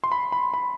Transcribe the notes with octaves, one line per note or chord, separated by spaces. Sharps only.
C6
B5
B5
B5